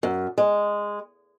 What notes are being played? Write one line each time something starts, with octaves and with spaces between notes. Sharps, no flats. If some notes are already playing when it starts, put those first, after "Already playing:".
F#2
G#3